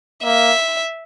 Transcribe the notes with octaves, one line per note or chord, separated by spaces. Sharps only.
A#3 E5